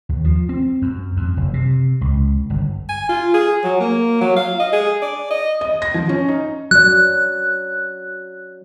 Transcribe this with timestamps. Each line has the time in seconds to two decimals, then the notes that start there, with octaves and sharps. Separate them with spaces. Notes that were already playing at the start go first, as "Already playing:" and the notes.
0.09 D#2
0.24 F3
0.49 C4
0.82 F#2
1.17 F2
1.37 F#1
1.54 C3
2.01 C#2
2.50 G1
2.89 G#5
3.09 F4
3.34 G#4
3.64 F#3
3.81 A#3
4.21 F#3
4.36 F5
4.60 D#5
4.73 G#4
5.02 D5
5.31 D#5
5.61 D#5
5.82 A#6
5.94 F3
6.09 C#4
6.29 D#4
6.71 F#3 D5 F#6